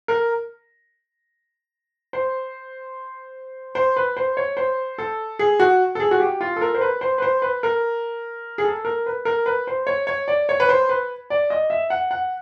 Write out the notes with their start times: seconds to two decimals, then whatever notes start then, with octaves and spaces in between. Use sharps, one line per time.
0.08 A#4
2.13 C5
3.75 C5
3.97 B4
4.17 C5
4.37 C#5
4.57 C5
4.98 A4
5.39 G#4
5.60 F#4
5.95 A4
6.00 G#4
6.11 F#4
6.20 G4
6.41 F4
6.56 A4
6.61 A#4
6.74 C5
6.81 B4
7.01 C5
7.18 B4
7.22 C5
7.42 B4
7.63 A#4
8.58 G#4
8.64 A4
8.85 A#4
9.06 B4
9.25 A#4
9.46 B4
9.67 C5
9.87 C#5
10.07 C#5
10.28 D5
10.49 C#5
10.60 B4
10.69 C5
10.89 B4
11.30 D5
11.50 D#5
11.70 E5
11.90 F#5
12.11 F#5